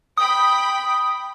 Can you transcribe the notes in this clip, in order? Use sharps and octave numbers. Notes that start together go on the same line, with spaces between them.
G5 B5 D#6